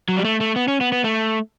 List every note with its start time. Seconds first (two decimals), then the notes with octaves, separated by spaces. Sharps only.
0.09 F#3
0.16 G3
0.25 A3
0.41 A3
0.56 B3
0.68 C#4
0.81 B3
0.92 B3
1.04 A3